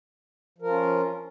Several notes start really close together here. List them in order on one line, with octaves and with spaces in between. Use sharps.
F3 A#4 F4 C#4